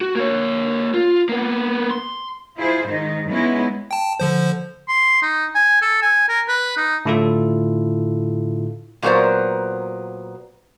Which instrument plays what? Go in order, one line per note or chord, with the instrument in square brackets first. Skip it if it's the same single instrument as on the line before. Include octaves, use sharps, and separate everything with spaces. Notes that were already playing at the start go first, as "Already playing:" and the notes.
[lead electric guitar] F#4
A#3 C#5
F4
A#3 B3
C6
[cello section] E4 F4 G#4 C5
G#2 D#3 D#4
G#3 B3 C#4 D#4 E4
[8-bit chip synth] G5 A5
D3 F3 C5
[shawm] C6
D#4
G#5
A4
G#5
A#4
B4
D#4
[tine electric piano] A2 D3 E4 F4 A4
[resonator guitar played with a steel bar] A#2 F#3 B3 A#4 C5 D5